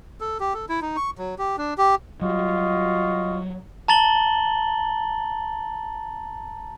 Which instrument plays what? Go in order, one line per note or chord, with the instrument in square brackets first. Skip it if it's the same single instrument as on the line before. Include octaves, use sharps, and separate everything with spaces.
[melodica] A4
G4
A4
E4
D#4
C#6
F#3
G4
D4
G4
[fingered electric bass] F#3 G3 [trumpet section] F4 F#4 D#5
[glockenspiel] A5 A#5 A6 F#7 G7